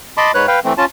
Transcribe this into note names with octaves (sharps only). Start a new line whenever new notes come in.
D#5 A5 B5 C6 D6
G#2 B4 C#5 F#6
B4 F5 G5
E3 A3 C4
C#4 F4 A5